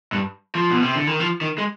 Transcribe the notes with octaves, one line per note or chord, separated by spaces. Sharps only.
G2
F3
B2
C3
D3
D#3
F3
D#3
G#3